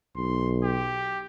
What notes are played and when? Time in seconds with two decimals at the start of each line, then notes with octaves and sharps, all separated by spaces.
0.16 B1 C6
0.63 G4